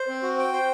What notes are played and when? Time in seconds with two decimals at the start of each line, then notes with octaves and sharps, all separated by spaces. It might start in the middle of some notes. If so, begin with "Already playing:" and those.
Already playing: C5
0.08 C4
0.23 F#4
0.38 G5
0.53 C5